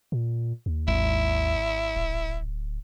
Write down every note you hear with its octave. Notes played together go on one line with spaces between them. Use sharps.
A#2
D#2
G#1 E4
D1